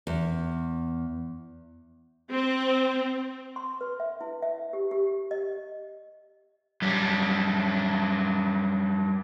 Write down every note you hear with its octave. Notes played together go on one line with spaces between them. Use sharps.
E2
C4
C6
B4
E5
E4
E5
G4
G4
D#5
F#2 G3